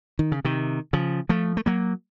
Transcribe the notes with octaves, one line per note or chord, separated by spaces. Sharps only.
D#3
C#3
C3 D#3
C#3 F3
F3 A3
A3
F#3 A#3